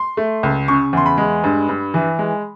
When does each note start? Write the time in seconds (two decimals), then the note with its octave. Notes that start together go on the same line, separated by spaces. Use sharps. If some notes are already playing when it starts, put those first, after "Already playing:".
Already playing: C6
0.17 A3
0.43 C#2
0.68 C#3 C#6
0.93 E2 C6
1.06 B5
1.18 G#3
1.44 G2
1.69 G2
1.94 E3
2.19 G#3